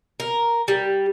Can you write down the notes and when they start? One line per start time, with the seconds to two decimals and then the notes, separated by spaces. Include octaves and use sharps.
0.20 A#4
0.68 G3